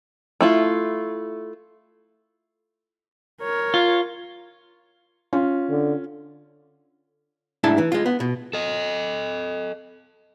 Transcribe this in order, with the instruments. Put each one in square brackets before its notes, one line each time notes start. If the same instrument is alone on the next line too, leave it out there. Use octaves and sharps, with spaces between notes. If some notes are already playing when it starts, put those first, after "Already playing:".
[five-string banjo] A3 E4 F4
[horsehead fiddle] A#4 C#5
[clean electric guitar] F4
[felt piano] C#4 F4
[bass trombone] D3
[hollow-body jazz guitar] G#2 A3 D4 E4 A5
E3
G#3 F4
B3
B2
[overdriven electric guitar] A4 D#5